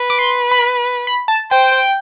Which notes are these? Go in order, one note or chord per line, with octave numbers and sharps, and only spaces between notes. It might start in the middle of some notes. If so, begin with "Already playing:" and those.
Already playing: B4
D6
C6
B5
B5
A5
C5 G5